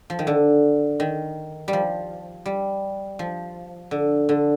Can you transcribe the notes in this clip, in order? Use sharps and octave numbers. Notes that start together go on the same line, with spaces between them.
F3
D#3
D3
D#3
G3
F3
G3
F3
D3
D3